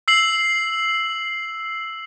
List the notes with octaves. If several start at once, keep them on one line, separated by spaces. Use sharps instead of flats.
E6 C7 F#7